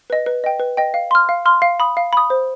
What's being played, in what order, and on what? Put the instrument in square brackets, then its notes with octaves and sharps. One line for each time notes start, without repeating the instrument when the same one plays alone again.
[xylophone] B4 D#5
B4
D#5 G5
B4
D#5 G5
F5
C6 F6
F5
C6 F6
F5
B5 D#6
F5
B5 D#6
C5